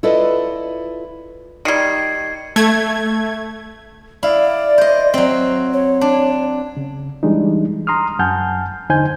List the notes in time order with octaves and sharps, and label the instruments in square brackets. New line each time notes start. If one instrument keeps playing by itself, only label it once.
[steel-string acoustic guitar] E4 F4 A4 B4 D5 D#5
[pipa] D#3 G3 [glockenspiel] G#6 C7 C#7
[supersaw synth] A3 G#6
[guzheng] E4 F5 [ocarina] D5
[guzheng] C5 D#5
F#3 C4
[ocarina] C#5
[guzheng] D4
[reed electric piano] C#3
E3 G3 G#3 D4 D#4
A#5 C6 D#6 F6
F#2 F#5 G#5 A5 F6 G6
E2 D3 D#4 C5 G#5 G6